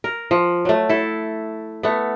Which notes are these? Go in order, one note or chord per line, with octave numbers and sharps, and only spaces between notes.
A#4
F3
F#3 A3
E4 A4
A3 B3